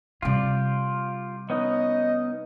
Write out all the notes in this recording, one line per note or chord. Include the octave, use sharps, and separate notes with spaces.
C3 G3 F4 G4 D5
B3 C#4 D#4 D#5